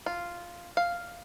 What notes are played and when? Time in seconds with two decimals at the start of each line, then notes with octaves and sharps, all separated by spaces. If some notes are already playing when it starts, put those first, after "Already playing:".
0.06 F4
0.77 F5